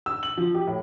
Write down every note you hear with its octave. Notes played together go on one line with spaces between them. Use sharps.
E6
F#7
F3
G4
A2